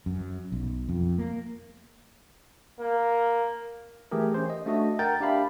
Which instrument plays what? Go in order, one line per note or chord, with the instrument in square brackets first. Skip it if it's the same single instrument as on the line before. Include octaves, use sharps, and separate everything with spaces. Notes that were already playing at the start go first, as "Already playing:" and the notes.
[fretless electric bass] F#2
B1
F2
A#3
[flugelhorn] A#3
[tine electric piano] E3 A3 G4 G#4 A#4
C#4 C5
D#5
A3 D4 F#4 D#5
A#4 F#5 G5 A#5 G6 A6
D4 G4 E5 F5 B5